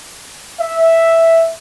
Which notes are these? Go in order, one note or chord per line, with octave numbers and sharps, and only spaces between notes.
E5